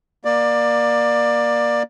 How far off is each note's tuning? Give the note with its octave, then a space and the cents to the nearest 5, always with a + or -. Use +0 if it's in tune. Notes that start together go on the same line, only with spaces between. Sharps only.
A#3 +15 D5 +15